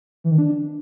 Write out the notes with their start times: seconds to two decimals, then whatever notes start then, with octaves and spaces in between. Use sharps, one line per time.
0.24 E3
0.31 D#3
0.38 D4